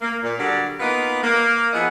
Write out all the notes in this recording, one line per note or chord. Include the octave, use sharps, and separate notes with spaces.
A#3
A#2
D3 F#3 G3 D4 D5
A#3 B3 D#4 F4 B4
A#3
F3 B3 E4 G#4 D#5 F#5